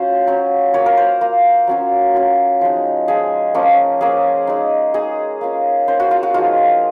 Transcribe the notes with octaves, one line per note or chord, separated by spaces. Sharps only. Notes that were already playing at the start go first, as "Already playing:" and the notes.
Already playing: F#3 C#4 F4 C5
F#3 C#4 F4
A#3 F4 C#5
A#4
C5
A#3 F4
F#3 C#4 F4
F#3 C#4 F4
F3 G#3 D#4
F3 G#3 D#4 G#4
F3 A#3 C#4
F3 A#3 C#4 G#4
G#3 D#4
G#3 D#4 G#4
A#3 C#4 F4
A#3 C#4 F4 C5
F#4
F4
F#4
F3 G#3 D#4 F4